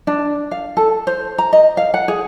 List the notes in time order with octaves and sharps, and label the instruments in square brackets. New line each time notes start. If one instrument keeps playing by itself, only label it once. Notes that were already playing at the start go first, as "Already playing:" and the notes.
[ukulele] D4
F5
A4
C5
A#5
D#5
F5
F#5
G#4